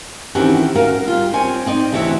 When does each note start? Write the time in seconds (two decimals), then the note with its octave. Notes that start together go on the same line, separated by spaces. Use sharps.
0.35 D#3 E3 C4 C#4 F#4 G4
0.75 C#4 F#4 A#4 F5
1.08 G3 F4
1.33 C4 C5 C#5 G#5
1.66 C4 D#4 D5
1.92 D2 C3 E3 F#4 C#5 E5